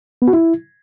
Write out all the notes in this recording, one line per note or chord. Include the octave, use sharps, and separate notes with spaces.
B3
F#4
E4